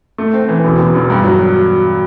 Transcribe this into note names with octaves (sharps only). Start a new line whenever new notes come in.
A3
C4
E3
E1
E1
E1
G2
F#3